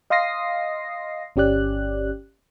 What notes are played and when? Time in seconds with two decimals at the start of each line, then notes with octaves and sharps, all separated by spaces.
0.10 D#5 F5 C6 D#6 A#6 C7
1.36 G1 C#4 G4 D5 F#6